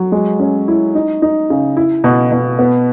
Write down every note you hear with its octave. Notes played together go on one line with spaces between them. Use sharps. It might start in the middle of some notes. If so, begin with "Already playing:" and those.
Already playing: F#3
G#3
C#4
E4
D#4
D#4
C#3
E4
B2
B2
B3